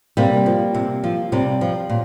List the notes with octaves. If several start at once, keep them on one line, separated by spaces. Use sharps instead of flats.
C3 G3 A#3
F3
C3
F3
C3 G3
F3
A#2